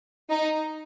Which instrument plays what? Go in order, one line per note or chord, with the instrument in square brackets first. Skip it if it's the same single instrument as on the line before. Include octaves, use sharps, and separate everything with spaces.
[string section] D#4